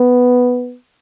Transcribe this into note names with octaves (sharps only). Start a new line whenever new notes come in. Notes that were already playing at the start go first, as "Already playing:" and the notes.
Already playing: B3